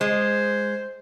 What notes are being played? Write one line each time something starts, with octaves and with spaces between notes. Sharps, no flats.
G#3 C5